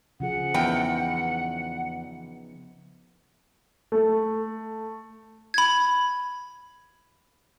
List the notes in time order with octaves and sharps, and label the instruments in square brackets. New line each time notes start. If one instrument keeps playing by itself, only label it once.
[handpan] C#3 F3 G#4 [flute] F#5
[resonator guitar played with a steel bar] E2 G5 [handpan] B3 D#4
[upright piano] A3
[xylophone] B5 G#6